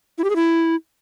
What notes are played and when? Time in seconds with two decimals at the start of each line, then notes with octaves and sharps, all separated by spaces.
0.18 E4
0.24 G4
0.30 G#4
0.36 E4